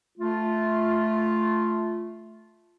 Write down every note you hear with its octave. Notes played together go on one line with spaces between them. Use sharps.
A3 F4